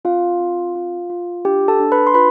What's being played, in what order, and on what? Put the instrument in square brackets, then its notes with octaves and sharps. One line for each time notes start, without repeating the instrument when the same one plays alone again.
[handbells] C4 F4 F5
C4
F4
F4
D4 G4 G5
A4 A5
D4
B4 B5
C6
F4 B4 B5